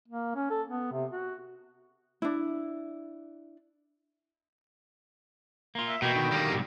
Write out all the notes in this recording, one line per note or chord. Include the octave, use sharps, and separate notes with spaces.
A#3
C#4
A4
B3
C3
F#4
D4 E4
A#3 F4
E5
B2 E3 A#3 G5
D3 D#3
G3 A#3
F2 G#2 C3